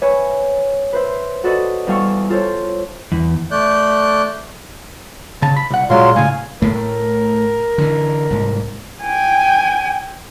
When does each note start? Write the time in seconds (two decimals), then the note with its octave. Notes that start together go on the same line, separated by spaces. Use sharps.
0.02 B4 C#5 E5 G#5 B5
0.93 B4 C5 E5
1.44 F#4 A4 B4 D5 D#5
1.87 E2 G3 A4 F5 C#6 E6
2.29 F4 A4 C5 C#5
3.12 E2
3.51 A3 D5 F#6 G6
5.42 C#3 A5
5.57 B5
5.70 C2 F#5
5.90 A#2 F#3 G#3 F4 C6
6.16 A2 C#3 F5 G#5
6.62 A2 A3 A#4
7.78 D3 E3
8.30 C2 G#2
9.03 G5 G#5